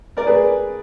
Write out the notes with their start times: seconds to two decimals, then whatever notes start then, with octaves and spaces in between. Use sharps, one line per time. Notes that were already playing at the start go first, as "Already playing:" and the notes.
0.17 A#4 D5
0.27 G#4 B4